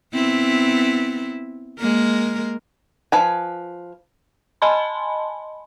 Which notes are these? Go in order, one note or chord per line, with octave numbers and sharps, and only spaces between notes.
B3 C4 E4
G#3 A#3 A#4
F3 B4 G#5
D#5 G#5 A5 B5 C6